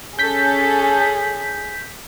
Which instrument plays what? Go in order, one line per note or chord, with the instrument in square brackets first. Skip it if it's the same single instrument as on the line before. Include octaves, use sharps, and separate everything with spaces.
[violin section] C#4 A4 [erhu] G#4 [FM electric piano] G6 B6